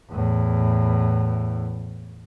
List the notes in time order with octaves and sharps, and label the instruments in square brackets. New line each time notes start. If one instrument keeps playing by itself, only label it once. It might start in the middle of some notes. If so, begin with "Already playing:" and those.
[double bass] E2 A2